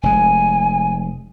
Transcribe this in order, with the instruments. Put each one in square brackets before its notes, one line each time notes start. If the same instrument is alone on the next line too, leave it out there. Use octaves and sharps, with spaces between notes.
[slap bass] F1 G#3 [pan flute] G#5